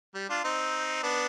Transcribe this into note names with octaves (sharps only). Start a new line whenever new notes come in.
G3
D4 F4
C4 D#4
B3 D4